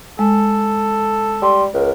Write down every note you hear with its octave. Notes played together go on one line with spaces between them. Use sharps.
G#3 A4
G3 C6
C#2 A#4